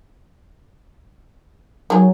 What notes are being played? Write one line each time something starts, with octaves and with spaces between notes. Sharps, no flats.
D#3 F#3 G#4